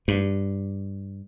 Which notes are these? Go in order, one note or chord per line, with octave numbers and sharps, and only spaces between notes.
G2